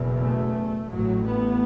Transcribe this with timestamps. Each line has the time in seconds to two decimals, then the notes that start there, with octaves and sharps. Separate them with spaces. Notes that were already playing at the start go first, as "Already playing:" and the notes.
Already playing: F#1 E2 B2
0.24 A3
0.90 A1 A2 F#3
1.24 B3